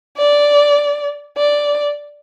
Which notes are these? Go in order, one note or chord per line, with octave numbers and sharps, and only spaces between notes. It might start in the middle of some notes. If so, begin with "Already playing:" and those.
D5
D5